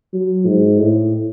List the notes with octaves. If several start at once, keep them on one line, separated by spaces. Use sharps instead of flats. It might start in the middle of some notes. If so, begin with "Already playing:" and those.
F#3
G#2
A2